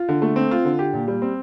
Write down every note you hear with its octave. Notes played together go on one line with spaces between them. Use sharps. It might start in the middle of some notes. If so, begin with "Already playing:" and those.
Already playing: F4
D3
A3
C4
F4
D3
G4
A#2
G3
C4